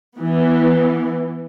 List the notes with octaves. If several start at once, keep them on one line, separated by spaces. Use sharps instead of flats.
E3 B3